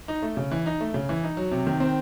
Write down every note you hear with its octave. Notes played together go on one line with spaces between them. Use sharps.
D#4
A3
C#3
E3
D#4
A3
C#3
E3
D#4
F#3
C3
D#3
C4